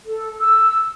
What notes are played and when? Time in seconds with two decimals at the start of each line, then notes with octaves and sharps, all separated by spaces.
0.06 A4
0.40 E6